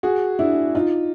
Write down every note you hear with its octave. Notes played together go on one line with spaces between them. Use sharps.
F#4 G#4
D4 E4
D#4 F4